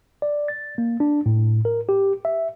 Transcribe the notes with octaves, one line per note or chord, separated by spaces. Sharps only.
D5
A6
A#3
D4
A2
A#4
G4
E5